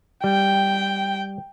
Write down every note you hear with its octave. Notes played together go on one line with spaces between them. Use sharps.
G3 G5